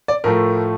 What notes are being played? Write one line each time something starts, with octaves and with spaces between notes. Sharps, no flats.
D5
A2 F3 A3 A#4